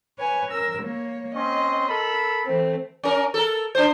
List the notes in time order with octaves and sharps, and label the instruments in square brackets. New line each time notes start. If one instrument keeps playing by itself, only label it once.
[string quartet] B4 C#5 G#5
A#4 E6
A#3 C#5
[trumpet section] C4 C#4 C6 [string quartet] D#5
[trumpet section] A4 A#4 B5 [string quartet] E6
[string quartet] E3 A3 C4
[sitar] C#4 A#4
A4 A#4
D4 C5